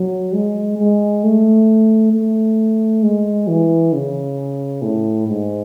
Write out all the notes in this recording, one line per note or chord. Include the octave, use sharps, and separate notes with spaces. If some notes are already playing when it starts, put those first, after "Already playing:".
Already playing: F#3
G#3
G#3
A3
A3
G#3
E3
C#3
A2
G#2